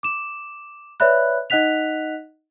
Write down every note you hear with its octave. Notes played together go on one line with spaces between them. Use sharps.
D6 E7
B4 C#5 D5 E5 B5 F#6
D#4 D#5 F#5 F#6 B6 F7